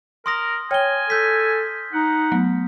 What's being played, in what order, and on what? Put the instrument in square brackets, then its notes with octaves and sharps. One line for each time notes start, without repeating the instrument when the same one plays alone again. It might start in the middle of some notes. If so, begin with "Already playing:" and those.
[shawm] A#4 [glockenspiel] C6 D#6 A#6
[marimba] C#5 G5 [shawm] G#5 [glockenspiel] F6 G7
[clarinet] A4 [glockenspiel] G6 B6
[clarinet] D#4 [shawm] F#5
[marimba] F#3 A3 B3